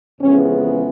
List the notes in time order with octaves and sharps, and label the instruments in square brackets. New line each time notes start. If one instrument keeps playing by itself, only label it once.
[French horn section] F2 C#3 E3 G#3 B3 C#4